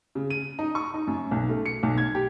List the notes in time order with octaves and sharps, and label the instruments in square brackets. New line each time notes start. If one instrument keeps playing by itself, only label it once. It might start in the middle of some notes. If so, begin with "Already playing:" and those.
[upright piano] C#3
D#7
D#4
C#6
D#4
F#2
B1
A3
C#7
B1
G#6
G4